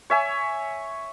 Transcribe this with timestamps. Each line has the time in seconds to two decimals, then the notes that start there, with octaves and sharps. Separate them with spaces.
0.10 C#5 E5 G#5